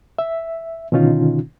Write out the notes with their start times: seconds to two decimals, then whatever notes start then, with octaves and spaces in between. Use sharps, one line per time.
0.19 E5
0.92 B2 D3 D#3 C#4 D#4 F4